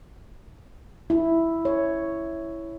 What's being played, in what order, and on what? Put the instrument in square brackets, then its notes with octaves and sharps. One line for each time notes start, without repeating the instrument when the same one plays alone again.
[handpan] E4
C#5